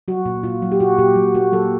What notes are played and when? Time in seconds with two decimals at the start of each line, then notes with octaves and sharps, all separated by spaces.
0.08 F#3 F#4
0.26 A#2
0.43 A#2 F4
0.62 F#3
0.72 G4
0.80 A#2 F#4
0.98 A#2 G4
1.16 F#3
1.35 A#3 F#4
1.52 F#3 A4